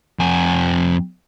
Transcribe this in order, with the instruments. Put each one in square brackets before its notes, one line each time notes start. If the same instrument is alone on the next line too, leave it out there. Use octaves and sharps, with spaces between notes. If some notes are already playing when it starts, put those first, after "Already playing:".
[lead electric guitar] F2 G#5